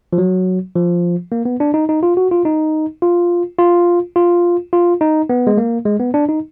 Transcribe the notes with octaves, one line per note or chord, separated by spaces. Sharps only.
F3
F#3
F3
A#3
B3
D4
D#4
D#4
F4
F#4
F4
D#4
F4
F4
F4
F4
D#4
B3
G#3
A#3
G#3
B3
D4
D#4